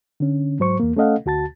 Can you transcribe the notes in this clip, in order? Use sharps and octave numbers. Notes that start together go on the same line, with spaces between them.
D3 C#4
G#2 F#3 C5 C#6
E2 A#3
A3 C#4 A4 D#5 F5 F#5
D2 F#4 A5 A6